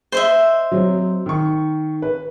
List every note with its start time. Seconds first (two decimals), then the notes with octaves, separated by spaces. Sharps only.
0.12 C5 D#5 E5
0.71 F#3 C4
1.26 D#3 C#6
2.02 B4